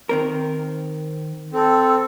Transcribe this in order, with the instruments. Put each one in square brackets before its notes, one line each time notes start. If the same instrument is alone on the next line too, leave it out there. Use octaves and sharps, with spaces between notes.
[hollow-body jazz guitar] D#3 C4 A#4
[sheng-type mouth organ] C4 [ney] A4